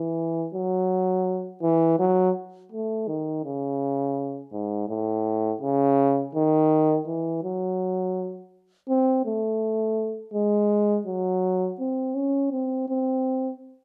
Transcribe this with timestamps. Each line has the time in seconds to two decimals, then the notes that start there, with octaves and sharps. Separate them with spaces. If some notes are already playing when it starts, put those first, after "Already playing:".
Already playing: E3
0.54 F#3
1.62 E3
1.99 F#3
2.72 A3
3.08 D#3
3.44 C#3
4.52 G#2
4.89 A2
5.61 C#3
6.35 D#3
7.07 E3
7.44 F#3
8.89 C4
9.26 A3
10.34 G#3
11.06 F#3
11.79 C4
12.15 C#4
12.52 C4
12.89 C4